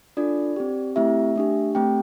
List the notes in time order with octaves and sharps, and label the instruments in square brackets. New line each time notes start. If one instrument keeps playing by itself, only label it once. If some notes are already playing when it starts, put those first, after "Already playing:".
[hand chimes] D4 F4 A4 D5
C4 G4
A3 C4 E4 G4 E5
A3 D4 G4
A3 C4 G4 G5